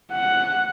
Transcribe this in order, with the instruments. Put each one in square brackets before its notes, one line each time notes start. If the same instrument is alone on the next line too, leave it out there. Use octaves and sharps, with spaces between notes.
[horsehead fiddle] F#5